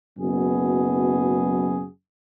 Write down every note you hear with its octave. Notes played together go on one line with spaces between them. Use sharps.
F#1 F#2 B2 B3 G#4